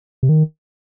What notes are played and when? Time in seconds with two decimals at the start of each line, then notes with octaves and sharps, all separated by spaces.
0.23 C3
0.29 D#3